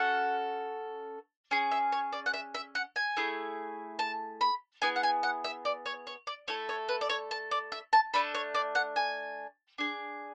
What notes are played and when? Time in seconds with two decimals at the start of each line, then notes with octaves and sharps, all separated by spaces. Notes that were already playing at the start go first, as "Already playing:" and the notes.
Already playing: C#4 F#4 A4 F#5
1.51 C#4 G#4 G#5
1.71 E5
1.92 C#5
2.13 D5
2.26 F#5
2.34 E5
2.54 E5
2.75 F#5
2.96 G#5
3.17 A3 E4 G#4
3.99 A5
4.41 B5
4.82 B3 E4 G#4 G#5
4.96 F#5
5.03 G#5
5.23 F#5
5.44 E5
5.65 D5
5.86 C#5
6.07 C#5
6.27 D5
6.48 A3 E4 A4 C#5
6.69 C#5
6.89 B4
7.01 D5
7.09 C#5
7.31 A5
7.51 D5
7.72 E5
7.93 A5
8.13 A3 D4 A4 B5
8.35 C#5
8.54 D5
8.75 F#5
8.96 G#5
9.78 D4 G#4